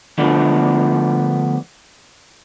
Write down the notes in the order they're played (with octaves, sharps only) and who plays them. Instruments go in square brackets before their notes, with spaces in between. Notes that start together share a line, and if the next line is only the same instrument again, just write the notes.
[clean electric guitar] D3 F3 A3 B3 D4